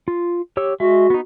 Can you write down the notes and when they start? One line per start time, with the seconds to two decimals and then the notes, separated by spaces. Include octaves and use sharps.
0.08 F4
0.57 G4 C#5 E6
0.80 G#3 F#4 E5
1.10 B3 D#4